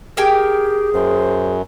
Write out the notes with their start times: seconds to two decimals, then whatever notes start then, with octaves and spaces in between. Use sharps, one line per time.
0.17 G4 G#4 A#4 G5 G#5
0.93 F#2 C5